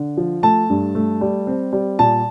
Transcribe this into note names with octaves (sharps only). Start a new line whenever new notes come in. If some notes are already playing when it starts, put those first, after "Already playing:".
Already playing: D3
F3
A3 A5
G2
A3
G3
C4
G3
A#2 A5